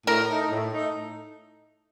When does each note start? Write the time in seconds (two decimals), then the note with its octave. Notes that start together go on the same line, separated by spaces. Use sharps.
0.07 A2 A#4
0.30 A3 D#4
0.51 A2
0.74 A3 D#4